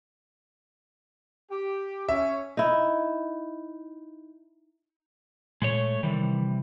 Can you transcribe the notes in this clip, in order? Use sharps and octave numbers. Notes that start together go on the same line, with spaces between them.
G4
C#4 E5
D#4 E4
A#2 G#3 A3 C#5
C3 D#3 E3 G3